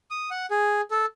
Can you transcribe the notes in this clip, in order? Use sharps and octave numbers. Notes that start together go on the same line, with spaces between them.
D#6
F#5
G#4
A4